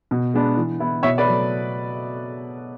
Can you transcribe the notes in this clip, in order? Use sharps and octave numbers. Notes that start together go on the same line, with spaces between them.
B2
G#3 B3 D4
E3
B3 E4
B2 C#5 E5
B4 D5
F#3 A3